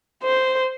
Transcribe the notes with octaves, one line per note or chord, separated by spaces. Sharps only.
C5